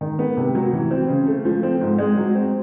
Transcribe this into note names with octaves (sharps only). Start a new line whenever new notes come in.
D#3
B3
C3
F#3
E3
C4
C#3
A3
F3
C4
G#2
G#3
F#3
C4